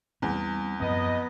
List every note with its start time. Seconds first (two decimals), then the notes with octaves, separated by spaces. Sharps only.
0.22 E2 G3 C4 C#4
0.80 F#2 F3 B3 C4 D#5